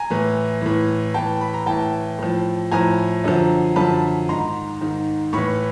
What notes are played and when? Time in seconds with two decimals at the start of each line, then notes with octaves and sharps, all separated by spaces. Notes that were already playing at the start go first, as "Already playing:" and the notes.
Already playing: G#5 A#5
0.10 A2 E3
0.62 A2 E3
1.14 A2 E3 G5 A5
1.41 B5
1.54 A#5
1.66 A2 E3 G5 A5
2.19 A2 F3
2.71 A2 F3 G#5 A#5
3.24 F#2 D3 F3
3.76 F#2 D3 F3 A5 B5
4.29 G#2 D#3 A#5 C6
4.81 G#2 D#3
5.33 A2 E3 B5 C#6